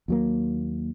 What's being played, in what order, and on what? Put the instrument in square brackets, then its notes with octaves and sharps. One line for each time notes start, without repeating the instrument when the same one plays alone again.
[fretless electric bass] D#2 F#3 A#3